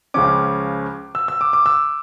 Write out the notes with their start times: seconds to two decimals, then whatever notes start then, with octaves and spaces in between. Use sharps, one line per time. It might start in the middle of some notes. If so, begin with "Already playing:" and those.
0.14 C#2 C#3 F3 C#4 D6
1.15 E6
1.28 E6
1.41 D6
1.53 D6
1.66 E6